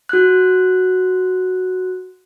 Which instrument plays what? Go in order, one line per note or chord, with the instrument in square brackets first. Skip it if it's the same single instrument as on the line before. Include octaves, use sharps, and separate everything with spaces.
[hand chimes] F#4 F#6